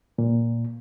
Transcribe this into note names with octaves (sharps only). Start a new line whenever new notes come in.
A#2